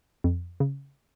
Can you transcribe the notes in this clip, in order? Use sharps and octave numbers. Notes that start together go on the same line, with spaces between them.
F2
C#3